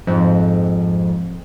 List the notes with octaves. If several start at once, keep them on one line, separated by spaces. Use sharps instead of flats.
F2 G#2